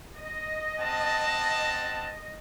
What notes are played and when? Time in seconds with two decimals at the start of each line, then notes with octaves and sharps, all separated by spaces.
0.18 D#5
0.79 C4 F#5 A5